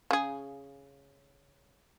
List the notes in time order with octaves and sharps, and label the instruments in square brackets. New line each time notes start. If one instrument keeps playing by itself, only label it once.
[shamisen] C#3 G#4